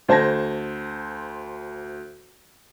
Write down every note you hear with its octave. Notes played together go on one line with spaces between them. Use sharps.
D2 C5 A5 G#6 A#6